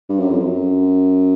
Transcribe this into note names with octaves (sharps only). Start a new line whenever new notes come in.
G2
F#2
F2
F#2